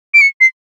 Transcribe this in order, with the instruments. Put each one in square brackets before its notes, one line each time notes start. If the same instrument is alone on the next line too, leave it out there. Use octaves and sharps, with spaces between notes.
[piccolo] D7
C#7
C7